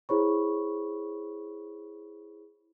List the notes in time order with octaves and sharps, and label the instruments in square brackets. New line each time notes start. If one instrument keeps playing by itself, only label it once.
[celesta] E4 G#4 C5 C#5 B5 C#6